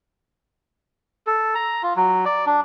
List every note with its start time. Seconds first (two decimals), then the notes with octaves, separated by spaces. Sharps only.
1.27 A4
1.55 A#5
1.83 F4
1.96 F#3
2.25 D5
2.46 D4